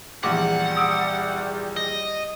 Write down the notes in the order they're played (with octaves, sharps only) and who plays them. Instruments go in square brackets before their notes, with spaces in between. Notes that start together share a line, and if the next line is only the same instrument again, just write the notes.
[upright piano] A#1 E2 [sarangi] G3 [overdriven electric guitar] F#5 [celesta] D6
[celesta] D#6 E6 D7
[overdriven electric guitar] D#5